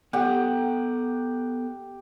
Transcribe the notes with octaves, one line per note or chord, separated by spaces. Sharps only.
B3 G4 A4 C#5 F#5